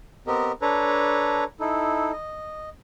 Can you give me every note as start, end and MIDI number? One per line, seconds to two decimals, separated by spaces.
0.27 0.52 59
0.27 0.52 60
0.27 0.52 67
0.27 0.52 70
0.27 0.52 75
0.62 1.44 62
0.62 1.44 69
0.62 1.44 71
0.62 1.44 73
0.62 1.44 82
1.60 2.12 63
1.60 2.12 64
1.60 2.12 69
2.12 2.69 75